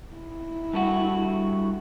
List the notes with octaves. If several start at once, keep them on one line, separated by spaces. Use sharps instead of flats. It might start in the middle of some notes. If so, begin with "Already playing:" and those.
E4
G2 A3 F#4